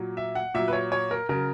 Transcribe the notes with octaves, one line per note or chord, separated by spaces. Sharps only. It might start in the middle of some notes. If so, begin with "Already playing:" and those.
Already playing: A#2 F#3
E5
F#5
A#2 F#3 E5
B4
C#5
C#5
A#4
C#3 F#3 A#4